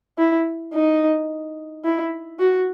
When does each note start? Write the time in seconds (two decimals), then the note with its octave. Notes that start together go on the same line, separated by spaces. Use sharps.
0.18 E4
0.74 D#4
1.85 E4
2.40 F#4